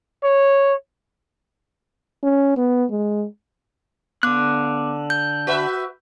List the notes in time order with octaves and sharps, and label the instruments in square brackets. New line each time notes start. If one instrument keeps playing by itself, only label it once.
[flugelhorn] C#5
[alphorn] C#4
B3
G#3
[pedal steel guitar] D3 F#6 [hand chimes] B3 D6
[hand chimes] G6
[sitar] F#4 B4 E5